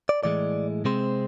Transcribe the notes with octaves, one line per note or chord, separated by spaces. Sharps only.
D5
A2 E3 G#3 D5
C3 G#3 C4 C5